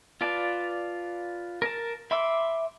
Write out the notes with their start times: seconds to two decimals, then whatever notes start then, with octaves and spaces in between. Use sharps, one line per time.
0.21 F4 B4 D5 A5
1.62 A#4 A5
2.11 E5 B5 C6 D6 E6